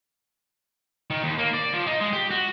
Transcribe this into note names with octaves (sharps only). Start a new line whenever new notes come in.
D#3
D#2
A#3
D5
F3
D#4
G#3
G4
F#4